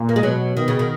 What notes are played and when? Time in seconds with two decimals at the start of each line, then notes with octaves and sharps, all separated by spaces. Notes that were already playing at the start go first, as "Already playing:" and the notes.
Already playing: A#2
0.09 A#3
0.16 G#3
0.23 B2 F#3
0.56 B2 D#3
0.68 C#3
0.79 D#3